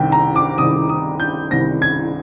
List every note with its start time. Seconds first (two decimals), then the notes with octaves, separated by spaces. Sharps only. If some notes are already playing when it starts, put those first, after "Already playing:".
Already playing: C2 C3 D#3 G5
0.12 A#5
0.36 D6
0.58 C2 C3 D#3 D#6
0.89 D#6
1.20 G6
1.51 C2 C3 D#3 A#6
1.82 G#6